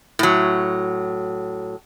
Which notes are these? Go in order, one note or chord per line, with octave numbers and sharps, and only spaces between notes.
A2 F#3